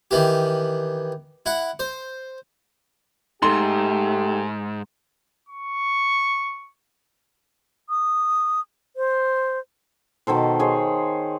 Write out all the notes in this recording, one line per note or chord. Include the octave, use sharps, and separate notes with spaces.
D#3 E3 G4
E4 F#5
C5
G#2 A3 D#4 G4 A4 C6
C#6
D#6
C5
B2 D#3 A4 C5
G#4 C5 C#5